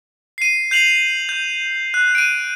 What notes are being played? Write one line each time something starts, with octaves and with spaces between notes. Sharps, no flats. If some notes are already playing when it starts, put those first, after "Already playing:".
C7 D#7
G6 C7 F7 F#7
G6
F#6
D7 D#7